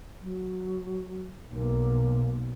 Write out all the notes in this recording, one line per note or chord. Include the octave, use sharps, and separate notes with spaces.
F#3
B1 A#3